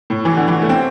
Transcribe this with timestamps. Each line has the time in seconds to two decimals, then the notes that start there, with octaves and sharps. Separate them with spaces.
0.10 A2
0.25 E3
0.36 D3
0.48 E3
0.62 A3
0.69 C4